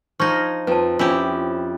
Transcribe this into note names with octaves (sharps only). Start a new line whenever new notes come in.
F3 D4 D#4 C#6 F6 G#6 A#6
F2 F4 B4 C5 A5
F2 C#4 E4 G4 E5 G#5 B5